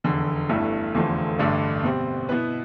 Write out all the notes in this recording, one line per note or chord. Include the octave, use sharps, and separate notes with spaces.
F1 E2 D3
G1 G2 E3 A3 E4
F1 E2 D3 F3 A3
A1 G2 D3 A3 D4
B2 G3 C4
B2 B3 E4 B4